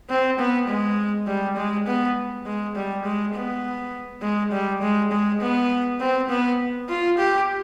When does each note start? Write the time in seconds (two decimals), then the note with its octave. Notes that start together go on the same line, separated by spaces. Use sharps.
0.10 C4
0.39 B3
0.68 G#3
1.27 G3
1.56 G#3
1.87 B3
2.46 G#3
2.76 G3
3.05 G#3
3.34 B3
4.22 G#3
4.52 G3
4.82 G#3
5.11 G#3
5.41 B3
6.00 C4
6.29 B3
6.89 F4
7.18 G4